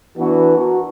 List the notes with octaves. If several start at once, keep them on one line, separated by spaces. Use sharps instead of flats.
E3 B3 D4 F#4
F#4 A#4